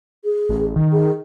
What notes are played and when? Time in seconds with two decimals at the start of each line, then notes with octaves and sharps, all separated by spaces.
0.25 G#4
0.49 A1
0.76 D#3
0.92 G#4